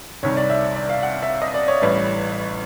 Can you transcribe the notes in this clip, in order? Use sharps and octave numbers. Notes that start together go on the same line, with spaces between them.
C2 C3 D#3 G3 C#5
D5
E5
D5
F5
F#5
E5
D#5
D5
C#5
A1 A2 E3 G3